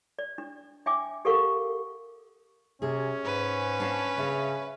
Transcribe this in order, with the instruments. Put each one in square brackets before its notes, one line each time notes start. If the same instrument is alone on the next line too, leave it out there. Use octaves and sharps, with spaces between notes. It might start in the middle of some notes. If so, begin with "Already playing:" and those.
[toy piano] D5
D4
D4 E5 G5 G#5 D6
G4 A4 A#4 F5 F#5 C#6
[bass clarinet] C3 [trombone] C#4 [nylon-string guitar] G#4
[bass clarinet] G#2 [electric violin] B4
[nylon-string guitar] D4 F5 A5
[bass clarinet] C#3 [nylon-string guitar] E5 F5